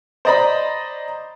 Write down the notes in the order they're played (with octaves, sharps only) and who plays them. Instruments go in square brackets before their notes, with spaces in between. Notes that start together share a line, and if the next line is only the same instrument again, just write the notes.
[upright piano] C5 D5 D#5 A#5 B5